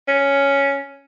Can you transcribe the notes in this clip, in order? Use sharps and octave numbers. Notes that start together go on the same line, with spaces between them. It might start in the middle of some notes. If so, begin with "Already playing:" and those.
C#4